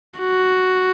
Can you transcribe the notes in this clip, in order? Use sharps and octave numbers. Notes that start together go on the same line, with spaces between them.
F#4